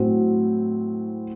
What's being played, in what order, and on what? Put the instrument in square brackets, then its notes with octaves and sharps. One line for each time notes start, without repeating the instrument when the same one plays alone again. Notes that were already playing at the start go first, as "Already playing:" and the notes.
Already playing: [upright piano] A2 F#3 C4